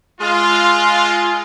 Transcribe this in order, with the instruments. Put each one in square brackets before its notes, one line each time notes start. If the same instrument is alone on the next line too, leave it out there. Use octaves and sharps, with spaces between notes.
[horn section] G#3 F4